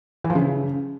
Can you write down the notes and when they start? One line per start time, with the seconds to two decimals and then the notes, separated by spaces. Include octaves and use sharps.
0.24 E3
0.30 F3
0.35 C#3